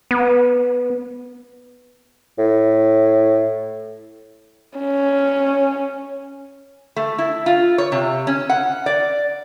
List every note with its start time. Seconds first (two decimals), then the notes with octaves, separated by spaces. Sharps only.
0.11 B3
2.39 A2
4.78 C#4
6.96 A3
7.18 E4
7.46 F4
7.78 C#5
7.92 C3
8.27 C#4
8.49 F#5
8.86 D5